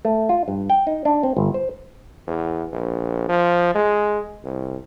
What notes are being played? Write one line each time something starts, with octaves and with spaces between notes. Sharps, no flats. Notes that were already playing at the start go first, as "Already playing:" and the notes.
A3
F4
G2
G5
D#4
D4
C4
G1
C5
E2
A#1
F3
G#3
C2